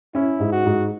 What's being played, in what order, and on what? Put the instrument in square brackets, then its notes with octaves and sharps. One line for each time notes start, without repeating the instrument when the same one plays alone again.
[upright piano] C#4 [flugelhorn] E4
[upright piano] G#2
[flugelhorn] F#4
[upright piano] G#2